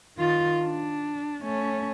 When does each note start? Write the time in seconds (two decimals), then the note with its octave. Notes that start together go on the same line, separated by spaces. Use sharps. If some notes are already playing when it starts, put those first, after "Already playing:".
0.18 D#3 F4
0.62 D4
1.42 A3 C#4